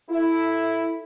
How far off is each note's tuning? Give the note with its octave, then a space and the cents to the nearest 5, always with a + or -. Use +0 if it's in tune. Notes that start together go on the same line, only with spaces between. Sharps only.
E4 +0 A4 +0